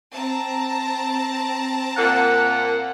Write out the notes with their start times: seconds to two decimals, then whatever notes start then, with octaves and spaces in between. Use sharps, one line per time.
0.13 C4 A5 A#5
1.97 A#2 A#3 F#5